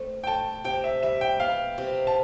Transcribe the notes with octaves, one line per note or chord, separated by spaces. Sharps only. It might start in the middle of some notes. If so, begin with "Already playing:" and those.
Already playing: A3 C4
G5
A3 A5
C3 G5
E5
G3 E5
G5
B3 F5
C3
A5